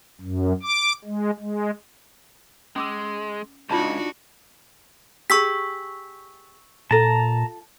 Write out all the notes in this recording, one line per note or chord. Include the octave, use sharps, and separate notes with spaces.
F#2
D6
G#3
G#3
G#3 C#4 D6 E6
C#2 D4 D#4 F4 F#4 A5 C#6
G4 G#4 C#6 E6 B6
A#2 F4 A4 A5 A#5